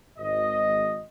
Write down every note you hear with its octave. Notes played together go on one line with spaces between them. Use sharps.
G#1 D#5